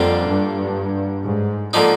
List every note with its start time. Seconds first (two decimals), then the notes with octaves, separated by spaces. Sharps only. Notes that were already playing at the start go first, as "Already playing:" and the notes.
Already playing: F2 D3 G3 A#3 D4 F4
0.27 G2
1.24 G#2
1.73 D3 F3 A#3 D#4